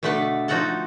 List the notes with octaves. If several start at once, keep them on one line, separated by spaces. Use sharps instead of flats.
B2 D3 A3 A4 B4 A5
F3 D#4 F#4 A4 F#5 A5